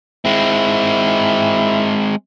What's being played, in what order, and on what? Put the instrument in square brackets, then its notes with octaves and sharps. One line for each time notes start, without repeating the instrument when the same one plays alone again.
[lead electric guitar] G#3 C4 [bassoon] E4